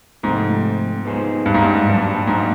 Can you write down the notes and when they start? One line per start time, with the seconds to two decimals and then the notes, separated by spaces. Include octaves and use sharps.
0.23 G#2 C3 F3 A3 C4
1.05 B3 D#4 G#4 C5
1.46 G2
1.54 G#2
1.62 G2
1.87 A#2 F#3 A#3 D4
2.27 G#2